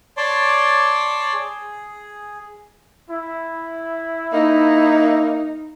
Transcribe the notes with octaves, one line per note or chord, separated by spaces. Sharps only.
C#5 D5 A5 C6 D6
G#4
E4
A#3 D#4